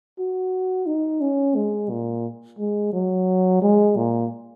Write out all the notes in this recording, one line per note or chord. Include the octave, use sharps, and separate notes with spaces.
F#4
D#4
C#4
G#3
A#2
G#3
F#3
G#3
A#2